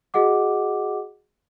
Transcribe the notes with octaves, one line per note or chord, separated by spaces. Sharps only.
F#4 G#4 D#5 F#5 D6